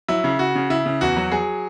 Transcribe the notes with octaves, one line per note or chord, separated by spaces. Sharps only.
F#3 E4
C#3
C#3 F#4
C#3
C#3 E4
C#3
E2 F#4
F#3
F#3 G#4